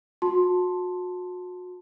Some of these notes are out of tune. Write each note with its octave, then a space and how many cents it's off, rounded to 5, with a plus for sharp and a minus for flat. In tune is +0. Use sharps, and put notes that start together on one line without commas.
F#4 -35 A5 +0 C6 +10